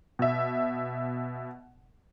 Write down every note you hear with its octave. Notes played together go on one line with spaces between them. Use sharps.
B2 E5